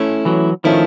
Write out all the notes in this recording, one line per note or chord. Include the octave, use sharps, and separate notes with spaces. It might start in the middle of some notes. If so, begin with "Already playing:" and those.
Already playing: A3 C#4 E4
E3 F#3
D#3 F3 A3 C#4 E4